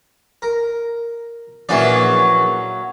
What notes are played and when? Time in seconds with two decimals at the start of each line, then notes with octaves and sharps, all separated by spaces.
0.42 A#4
1.69 A#1 E3 F#3 A#3 C#4 D5